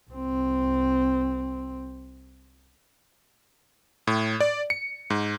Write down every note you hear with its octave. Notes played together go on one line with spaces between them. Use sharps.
C2 C4
A2
D5
C#7
G#2